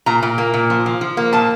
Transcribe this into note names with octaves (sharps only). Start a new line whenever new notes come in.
A#2 A#5
A#2
A#3
A#2
F3
F3
F3
A#3
A#2 A5